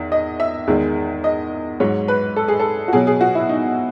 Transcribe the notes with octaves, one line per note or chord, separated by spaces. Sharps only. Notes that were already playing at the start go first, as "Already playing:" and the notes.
Already playing: E2 D#3
D#5
E5
E2 D#3 G#3
D#5
G#2 F#3 C#5
B4
A4
G#4
A4
F#4
B2 F#3 G#4
G#4
F#4
E4
D#4